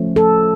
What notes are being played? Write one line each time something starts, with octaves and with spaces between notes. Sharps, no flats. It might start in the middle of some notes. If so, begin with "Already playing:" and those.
Already playing: F3 A3 C#4
A4